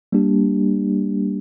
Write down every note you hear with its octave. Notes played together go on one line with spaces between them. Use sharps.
G3 A#3 D4 G4